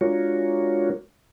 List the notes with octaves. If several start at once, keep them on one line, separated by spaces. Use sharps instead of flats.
G#3 D4 F4 F#4 A#4 C#5